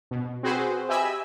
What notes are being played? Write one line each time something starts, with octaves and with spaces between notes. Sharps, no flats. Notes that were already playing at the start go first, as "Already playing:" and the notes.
B2
C4 F#4 G#4 B4 C5
G4 D#5 E5 G#5 B5 E6